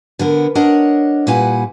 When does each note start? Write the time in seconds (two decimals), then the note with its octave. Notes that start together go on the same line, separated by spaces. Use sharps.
0.19 D3 B3 A#4
0.55 D4 A#4 C#5 D#5 F#5
1.27 A#2 G3 E4 B4 F#5 G#5